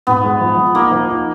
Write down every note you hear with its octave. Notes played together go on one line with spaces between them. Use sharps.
G#2 B3
G#3
F3
F3
A#3 D#4
F3
D#4